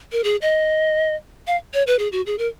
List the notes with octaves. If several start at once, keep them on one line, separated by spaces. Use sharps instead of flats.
A#4
G#4
D#5
F5
C#5
B4
G#4
F#4
G#4
A#4